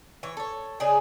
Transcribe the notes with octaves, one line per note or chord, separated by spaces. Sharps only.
E3 C#5
A4 C#5
C#3 D4 D#4 G#4